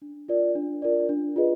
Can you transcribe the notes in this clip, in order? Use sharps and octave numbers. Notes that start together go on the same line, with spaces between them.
D4
F4 A#4 D5
D4
F4 A#4 D5
D4
F4 G#4 B4 D#5